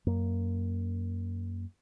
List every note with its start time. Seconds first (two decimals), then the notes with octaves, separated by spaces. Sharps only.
0.06 F#2 A#3